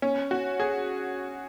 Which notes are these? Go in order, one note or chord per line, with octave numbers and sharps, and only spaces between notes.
C#4
F#4
G#4